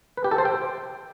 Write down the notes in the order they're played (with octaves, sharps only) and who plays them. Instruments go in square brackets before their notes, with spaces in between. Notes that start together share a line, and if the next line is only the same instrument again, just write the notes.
[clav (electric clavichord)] B4
G4
A4
C5
G5